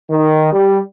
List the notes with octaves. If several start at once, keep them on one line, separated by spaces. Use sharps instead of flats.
D#3
G3